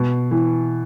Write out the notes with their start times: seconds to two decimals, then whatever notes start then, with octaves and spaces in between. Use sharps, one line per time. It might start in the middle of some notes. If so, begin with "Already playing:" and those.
Already playing: B2
0.31 E3